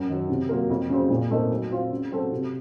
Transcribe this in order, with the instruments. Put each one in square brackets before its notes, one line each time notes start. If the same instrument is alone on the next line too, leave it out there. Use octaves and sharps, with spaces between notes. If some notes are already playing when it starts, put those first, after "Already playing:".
Already playing: [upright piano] F#2
D#3 F#3
C3
F#3 A#3 F4 A#4
F2
C#3 F#3 C4
A#2
A3 C4 D#4 A#4
F#3
C4 F4
C#3
F#3 C4 F#4 A4
C3